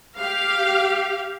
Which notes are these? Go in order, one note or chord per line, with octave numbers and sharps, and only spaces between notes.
G4 F5